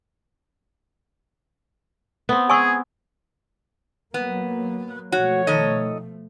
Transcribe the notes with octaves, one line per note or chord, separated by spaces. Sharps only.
B3 C4
G#4 G#5 C#6 E6
F#3 A#3 B3
B2 F3 A3 F#4 C#5
D#3 A4 D#5